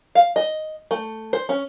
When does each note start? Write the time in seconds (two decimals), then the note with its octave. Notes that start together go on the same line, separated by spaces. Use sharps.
0.15 F5
0.36 D#5
0.91 A3
1.33 C5
1.49 C#4